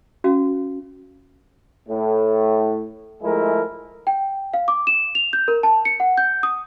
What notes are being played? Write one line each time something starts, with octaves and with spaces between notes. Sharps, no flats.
C#4 F#4 F5
A2 A3
F3 G#3 A3 E4 G#4 A#4
G5
F5
D6
E7
F7
G6
A#4
A5
C#7
F#5
G6
D#6